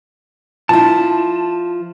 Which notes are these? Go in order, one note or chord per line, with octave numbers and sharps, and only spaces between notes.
F3 E4 A5